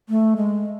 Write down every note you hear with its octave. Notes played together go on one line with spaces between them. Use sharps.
A3
G#3